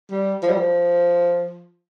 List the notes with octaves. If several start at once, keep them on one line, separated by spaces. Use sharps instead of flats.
G3
F3
G3
F3